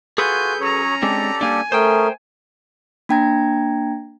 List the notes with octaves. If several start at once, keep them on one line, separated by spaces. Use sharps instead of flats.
F4 F#4 G#4 A4 B4 G#5 G6
F#3 C#4 C#5 A#5
G#3 C4 D4 G4 A4 D5
G3 A#3 D4 G#5
A3 C#4 G#4 A#4 C5 G5
A#3 D4 G5 A#5 G#6 A#6